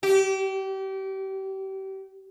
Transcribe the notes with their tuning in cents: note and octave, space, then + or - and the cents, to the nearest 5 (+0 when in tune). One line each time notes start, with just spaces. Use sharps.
G4 -30